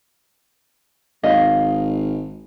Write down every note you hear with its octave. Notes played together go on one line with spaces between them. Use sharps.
G#1 D#5 F5